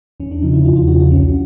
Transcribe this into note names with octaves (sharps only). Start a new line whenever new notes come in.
E2 C#4
D4
C#3 F3 D#4
E4
E2 F4
F4
C#3 F3 F#4
F#4
C2 C#4